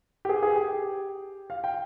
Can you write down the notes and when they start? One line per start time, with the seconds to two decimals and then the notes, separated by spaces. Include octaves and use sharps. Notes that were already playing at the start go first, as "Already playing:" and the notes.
0.25 G4
0.29 G#4
0.43 G#4
0.56 G4
1.50 F5
1.64 G5